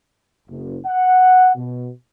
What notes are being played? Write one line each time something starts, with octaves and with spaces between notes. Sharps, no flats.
F#1
F#5
B2